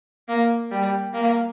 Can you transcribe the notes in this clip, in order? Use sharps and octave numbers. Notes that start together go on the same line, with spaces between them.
A#3
G3
A#3